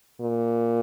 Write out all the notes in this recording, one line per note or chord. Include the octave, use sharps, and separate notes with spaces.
A#2